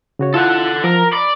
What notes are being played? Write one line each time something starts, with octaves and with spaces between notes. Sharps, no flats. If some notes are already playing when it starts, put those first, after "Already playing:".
C#3 F#4 C#5
E4 F4 A4 F#5
F3 A#4
D5 B5